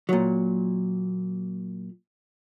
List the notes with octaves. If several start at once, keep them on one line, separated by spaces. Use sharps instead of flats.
A#2 F#3